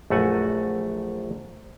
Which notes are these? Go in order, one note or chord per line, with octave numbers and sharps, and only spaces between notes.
A#1 F#2 A3 F#4 F#5 G#5